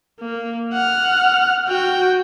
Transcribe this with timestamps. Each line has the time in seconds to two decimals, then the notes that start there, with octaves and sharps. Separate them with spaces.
0.20 A#3
0.74 F#5 F6
1.68 F#4 G5